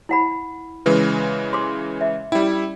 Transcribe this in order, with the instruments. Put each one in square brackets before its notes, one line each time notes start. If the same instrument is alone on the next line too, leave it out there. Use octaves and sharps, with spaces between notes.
[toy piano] E4 F#5 B5
[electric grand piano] C#3 E3 G#3 [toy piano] B4
[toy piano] C6 D6
E5
[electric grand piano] G3 E4 [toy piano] C#4